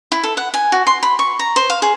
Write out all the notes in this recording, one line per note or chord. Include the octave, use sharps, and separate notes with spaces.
E4
A4
F#5
G#5
F#4
C6
B5
C#6
A#5
C5
F5
G#4